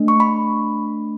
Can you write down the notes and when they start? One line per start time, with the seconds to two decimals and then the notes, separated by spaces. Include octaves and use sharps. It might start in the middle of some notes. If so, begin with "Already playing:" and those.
Already playing: A3 D4
0.08 C#6
0.20 B5